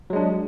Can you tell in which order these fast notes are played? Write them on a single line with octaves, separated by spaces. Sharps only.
F#3 G#3 D4